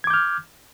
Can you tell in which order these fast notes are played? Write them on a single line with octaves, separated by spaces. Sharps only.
G#6 D6 G6 F6